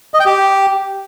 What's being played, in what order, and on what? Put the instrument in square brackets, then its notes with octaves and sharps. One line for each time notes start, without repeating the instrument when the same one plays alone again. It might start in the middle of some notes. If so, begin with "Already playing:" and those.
[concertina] D#5
G5
G4